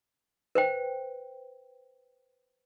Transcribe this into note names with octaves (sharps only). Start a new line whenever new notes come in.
B4 C5 G5